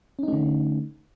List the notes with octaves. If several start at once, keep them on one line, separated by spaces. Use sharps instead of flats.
D3 A3 C#4 D#4